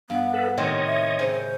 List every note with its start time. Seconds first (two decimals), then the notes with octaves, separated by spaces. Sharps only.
0.10 G2 B3 F5 F#5
0.34 A4 B4 F#5
0.58 A2 C3 D#3 C#5 D#5 G5 C6 G#6
0.87 E5
1.19 C#3 C#4 C5